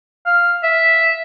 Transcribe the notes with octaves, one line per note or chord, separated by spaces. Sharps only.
F5
E5